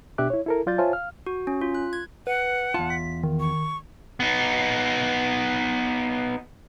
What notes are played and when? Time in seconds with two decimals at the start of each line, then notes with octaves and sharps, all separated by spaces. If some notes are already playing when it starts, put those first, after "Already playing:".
0.18 B2 D4 G4 E5 D6 F#6
0.30 E4 C#5
0.46 E4 A4 A#4
0.66 F#3 F4 D5 G6 A6
0.78 F4 C5 C#5 E5 G#5 A5
0.93 F5 F6
1.26 F#4
1.47 C#4
1.61 F4
1.75 F#6
1.93 G#6
2.27 B4 F#5
2.74 E2 F4 A5
2.90 B6
3.24 D#3
3.40 C#6
4.20 B3 D#4